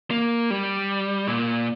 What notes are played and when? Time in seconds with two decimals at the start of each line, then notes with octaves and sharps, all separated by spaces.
0.11 A#3
0.50 G3
1.28 A#2